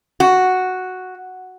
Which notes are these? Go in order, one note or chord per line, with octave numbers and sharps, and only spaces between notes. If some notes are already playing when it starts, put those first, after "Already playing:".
F#4